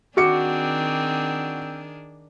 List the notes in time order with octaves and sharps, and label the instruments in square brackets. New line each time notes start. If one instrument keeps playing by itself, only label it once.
[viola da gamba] D#3 D4 G#4 [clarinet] C4 [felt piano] F#4 D6 C#7